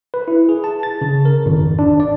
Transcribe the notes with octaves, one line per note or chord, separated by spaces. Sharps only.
B4
E4
G#4
A5
A6
C#3
A#4
G#1
F2
D4
D5